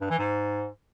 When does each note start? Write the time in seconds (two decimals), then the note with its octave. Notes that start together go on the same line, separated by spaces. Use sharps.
0.01 G2
0.10 E3
0.19 G#2